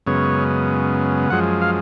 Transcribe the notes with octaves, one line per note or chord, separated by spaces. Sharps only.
F#2 C#3 G#3 B3 C#5
F#2 F3 G#3 F#5
F5